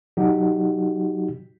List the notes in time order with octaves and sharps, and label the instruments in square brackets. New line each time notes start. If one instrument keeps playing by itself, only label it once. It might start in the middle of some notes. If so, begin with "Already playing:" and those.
[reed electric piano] F#3 D#4 F#4 G4